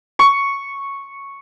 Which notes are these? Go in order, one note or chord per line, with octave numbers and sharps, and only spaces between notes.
C#6